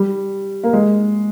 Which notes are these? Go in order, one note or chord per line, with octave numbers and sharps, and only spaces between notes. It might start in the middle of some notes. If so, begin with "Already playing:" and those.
Already playing: G3
A#3
G#3